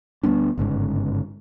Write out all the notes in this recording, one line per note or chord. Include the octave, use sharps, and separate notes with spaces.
D2 G3 B3 D4
G1 G#2 C#3